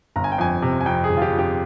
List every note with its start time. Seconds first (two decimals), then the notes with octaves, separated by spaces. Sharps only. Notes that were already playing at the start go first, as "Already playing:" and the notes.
0.16 G1 A#5
0.24 G#5
0.32 G5
0.38 F2 G#5
0.62 C3
0.80 G#5
0.86 F2 G5
1.04 G#4
1.09 G1
1.17 F4
1.22 G4
1.33 F2
1.39 G4